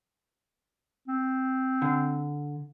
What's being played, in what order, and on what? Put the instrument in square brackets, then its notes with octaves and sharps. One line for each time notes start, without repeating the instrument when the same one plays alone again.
[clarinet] C4
[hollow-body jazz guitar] D3